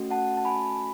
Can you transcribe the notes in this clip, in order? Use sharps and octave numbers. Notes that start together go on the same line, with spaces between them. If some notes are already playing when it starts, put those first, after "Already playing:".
Already playing: A3 C#4 F#4
F#5 A5
A5
G#5 B5